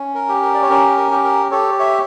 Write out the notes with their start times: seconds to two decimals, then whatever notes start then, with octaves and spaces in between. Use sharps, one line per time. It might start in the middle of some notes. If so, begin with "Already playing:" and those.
Already playing: C#4
0.15 A#4
0.29 G4
0.43 A#4
0.55 D5
0.62 C#5
0.69 C#4 A#4
0.97 A#4
1.11 G4
1.24 A#4
1.51 G4 A4 C#5
1.79 C#5 E5